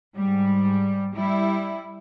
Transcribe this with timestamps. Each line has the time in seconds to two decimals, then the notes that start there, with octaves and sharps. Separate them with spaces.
0.15 G#2 G3
1.14 G3 E4